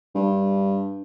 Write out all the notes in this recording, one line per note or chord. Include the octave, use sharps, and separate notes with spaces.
G2